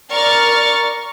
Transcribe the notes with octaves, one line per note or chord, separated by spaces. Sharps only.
A#4 D5 C#6 F6 A6